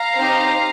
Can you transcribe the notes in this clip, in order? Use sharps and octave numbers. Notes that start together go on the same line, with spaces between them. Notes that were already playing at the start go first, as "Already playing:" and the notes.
Already playing: F5 A#5
C4 D#4 G4